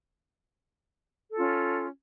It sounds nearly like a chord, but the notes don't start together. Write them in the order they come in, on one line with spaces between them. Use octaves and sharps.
A4 F4 C#4